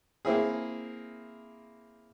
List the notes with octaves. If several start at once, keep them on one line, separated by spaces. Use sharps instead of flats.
A#3 C4 E4 G#4